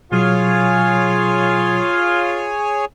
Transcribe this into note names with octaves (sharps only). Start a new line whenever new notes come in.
B2 F#3 F4 G#4 C#5 G#5